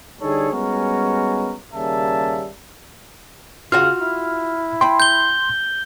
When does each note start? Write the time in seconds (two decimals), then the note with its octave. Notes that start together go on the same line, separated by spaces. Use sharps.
0.22 D3 G3 D#4 G#4 A4 C#5
0.52 G3 G#3 B3 C#4 F#4 A#4
1.74 D#2 C#3 G3 A#3 E5 A5
3.72 C#3 F4 F#4 F#5 F6
3.99 E4
4.81 G5 B5 C6
5.00 G6 G7